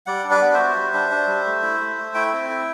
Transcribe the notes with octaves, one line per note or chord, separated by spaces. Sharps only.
G3 D5 F#5
D4
B4 D5
B3
F#4 C5 E5
G3
D4
D4
G3
A3
E4
A3
A3
E4 E5 G5
C4
E4